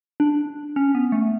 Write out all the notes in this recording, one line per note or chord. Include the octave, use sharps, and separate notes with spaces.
D4
C#4
B3
A3